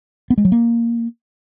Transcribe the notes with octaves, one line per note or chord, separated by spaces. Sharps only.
B3
G#3
F#3
A#3